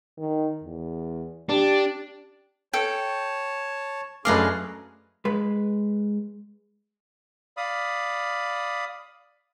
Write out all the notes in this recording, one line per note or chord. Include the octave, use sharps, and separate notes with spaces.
D#3
E2
D4 G4
A4 C#5 G5 A5
F#2 A3 D4 G#4 B4 D#5 F5 D6
G#3 B4
D5 F5 B5 D#6